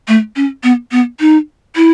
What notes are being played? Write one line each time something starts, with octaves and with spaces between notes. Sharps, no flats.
A3
C#4
B3
B3
D#4
E4